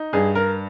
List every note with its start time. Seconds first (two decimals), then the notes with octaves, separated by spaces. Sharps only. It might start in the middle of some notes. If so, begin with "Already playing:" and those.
Already playing: D#4
0.13 G2 G#4
0.35 A#4